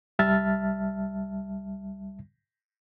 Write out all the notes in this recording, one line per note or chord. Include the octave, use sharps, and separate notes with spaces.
C2 G3 E5 A5 F6 A6